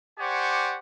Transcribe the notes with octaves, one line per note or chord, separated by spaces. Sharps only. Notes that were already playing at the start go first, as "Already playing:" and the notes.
G4 C5 D5 F#5 G#5 C#6